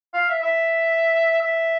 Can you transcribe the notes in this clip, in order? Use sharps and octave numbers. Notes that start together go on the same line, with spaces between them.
F5
E5
E5
E5